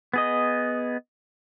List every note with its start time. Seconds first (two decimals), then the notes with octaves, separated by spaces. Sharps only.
0.14 B3 G#4 D#5